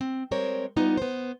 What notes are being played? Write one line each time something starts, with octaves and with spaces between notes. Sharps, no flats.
C4
G3 G#3 C4 A#4 C5 C#5
G3 B3 D#4 F4
B3 C5